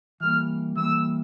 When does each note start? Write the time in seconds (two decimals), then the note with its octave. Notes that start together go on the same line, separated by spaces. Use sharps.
0.20 E3 G3 A#3 F6
0.76 E3 G3 A#3 E6